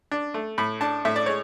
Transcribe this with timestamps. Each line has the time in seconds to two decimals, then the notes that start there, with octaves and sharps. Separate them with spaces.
0.11 D4
0.34 A3
0.58 A2 B5
0.81 D4 A5
1.05 A2 E5
1.16 D5
1.26 G#3 C#5